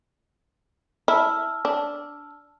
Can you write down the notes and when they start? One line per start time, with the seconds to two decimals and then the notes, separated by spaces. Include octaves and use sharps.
1.08 E4 A5 E6 F6
1.65 D4